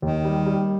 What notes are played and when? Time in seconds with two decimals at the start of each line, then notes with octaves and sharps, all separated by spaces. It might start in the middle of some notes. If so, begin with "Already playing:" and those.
0.02 D#2 D#3
0.25 G3
0.46 G3